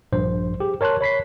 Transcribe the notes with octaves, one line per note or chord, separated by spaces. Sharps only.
A#1 G2 C5
G4 G#4
A#4 C#5 A5 C6 F#6
C#5 B5 B6 C7